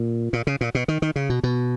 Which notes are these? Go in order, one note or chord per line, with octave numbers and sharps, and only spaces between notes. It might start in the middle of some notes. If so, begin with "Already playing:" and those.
Already playing: A#2
A#2
C#3
A#2
B2
D#3
D#3
C#3
B2
B2